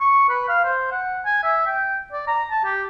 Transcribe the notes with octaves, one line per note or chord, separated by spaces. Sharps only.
C#6
B4
F5
C5
F#5
G#5
E5
G5
D5
A#5
A5
G4